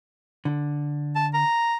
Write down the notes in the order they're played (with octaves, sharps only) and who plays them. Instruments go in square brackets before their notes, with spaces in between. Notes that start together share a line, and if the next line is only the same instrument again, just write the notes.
[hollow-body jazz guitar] D3
[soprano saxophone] A5
A#5